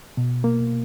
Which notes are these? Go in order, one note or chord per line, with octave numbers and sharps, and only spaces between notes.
B2
A#3